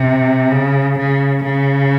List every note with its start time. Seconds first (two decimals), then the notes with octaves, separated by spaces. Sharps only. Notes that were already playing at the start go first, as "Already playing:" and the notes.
Already playing: C3
0.52 C#3
0.98 C#3
1.44 C#3